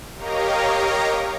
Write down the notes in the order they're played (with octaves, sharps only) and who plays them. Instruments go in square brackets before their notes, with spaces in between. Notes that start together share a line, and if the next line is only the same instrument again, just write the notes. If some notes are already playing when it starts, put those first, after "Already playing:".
[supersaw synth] G4 A#4 C#5 D#5 F5 A#5